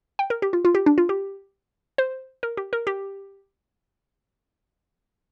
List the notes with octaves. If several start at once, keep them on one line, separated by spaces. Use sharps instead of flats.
G5
A#4
G4
F4
F4
G4
D4
F4
G4
C5
A#4
G4
A#4
G4